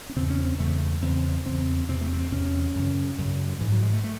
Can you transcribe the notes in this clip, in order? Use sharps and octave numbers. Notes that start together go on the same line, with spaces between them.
C#4
E2 C#3 C4
C#4
C4
E2 C#3 A3
E2 C#3 C4
E2 C#3 C4
E2 C3 C4
A3
C4
E2 C3 C#4
F#2 C#3
F#2 C#3
G#2 E3
F#3
G#3
A3
A3